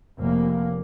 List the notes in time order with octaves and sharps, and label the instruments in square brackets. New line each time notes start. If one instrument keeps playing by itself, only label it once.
[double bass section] F1 A#3